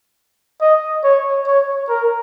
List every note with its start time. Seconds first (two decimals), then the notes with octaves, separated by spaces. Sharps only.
0.61 D#5
1.04 C#5
1.47 C#5
1.89 A#4